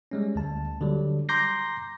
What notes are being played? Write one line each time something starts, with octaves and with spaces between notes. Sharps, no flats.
G3 G#3 C#4
D2 A5
D3 F#3 G3
A#5 C6 D6 G6 A#6 C7